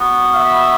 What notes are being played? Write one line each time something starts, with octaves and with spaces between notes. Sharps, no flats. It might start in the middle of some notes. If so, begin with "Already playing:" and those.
Already playing: B3 F#4
E5